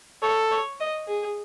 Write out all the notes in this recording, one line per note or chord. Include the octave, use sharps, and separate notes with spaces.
A4 C#5
C#5
D#5
G#4